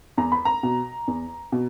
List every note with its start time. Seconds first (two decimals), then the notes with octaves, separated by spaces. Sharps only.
0.17 E2 A#5
0.32 B5
0.45 A#5
0.63 B2
1.08 E2
1.52 B2